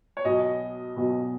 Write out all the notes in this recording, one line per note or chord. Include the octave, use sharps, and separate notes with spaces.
C#5
B1 B2 D#5
B1 B2